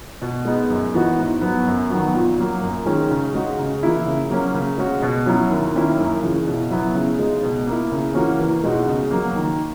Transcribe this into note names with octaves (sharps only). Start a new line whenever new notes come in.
B2
G#3 B3 D#4
F#2
E3 B3 D#4 F#4
G#2
F#3 B3
F#2
D#3 F#3 B3 F#4
A#2
F#3 A#3
F#2
D#3 G#3 C#4
C#3
G#3 D#4 F#4
C#3
E3 A#3 E4
C#3
F#3 A#3 C#4
C#3
G#3 C#4 F#4
B2
F#3 C#4 E4
D#2
D#3 A#3 C#4 E4
F#2
C#3 E3
B2
F#3 B3 E4
C#3
G#3 D#4
B2
A#3 E4
C#3
E3 A#3 C#4 F#4
E2
B2 G#3 D#4 F#4
C#3
F#3 A#3
D#3